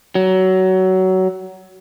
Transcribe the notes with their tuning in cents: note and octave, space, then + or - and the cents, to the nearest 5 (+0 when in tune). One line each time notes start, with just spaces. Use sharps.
F#3 +20